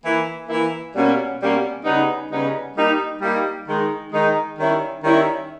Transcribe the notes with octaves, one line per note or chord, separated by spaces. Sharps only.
E3 A#3 E4
E3 A#3 E4
B2 G3 A#3 C#4
B2 G3 A#3 C#4
C#3 G3 B3 D#4
C#3 G3 B3 D#4
G3 A#3 D#4
G3 A#3 D#4
D#3 G#3 D#4
D#3 G#3 D#4
D#3 G3 C#4 E4
D#3 G3 C#4 E4